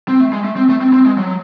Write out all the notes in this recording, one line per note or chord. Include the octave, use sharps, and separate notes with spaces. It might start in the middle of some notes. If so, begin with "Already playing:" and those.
C4
A3
G#3
A3
C4
A3
C4
C4
G#3
F#3